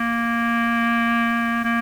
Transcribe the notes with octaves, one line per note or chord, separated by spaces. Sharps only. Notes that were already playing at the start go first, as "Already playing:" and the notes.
Already playing: A#3
A#3